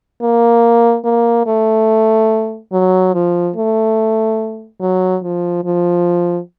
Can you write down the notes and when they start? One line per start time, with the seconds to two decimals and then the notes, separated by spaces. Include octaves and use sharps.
0.22 A#3
1.05 A#3
1.46 A3
2.73 F#3
3.13 F3
3.56 A3
4.80 F#3
5.23 F3
5.64 F3